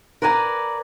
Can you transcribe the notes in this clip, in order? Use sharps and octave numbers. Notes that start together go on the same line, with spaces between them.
A#4 B4 D5 G#5 A#5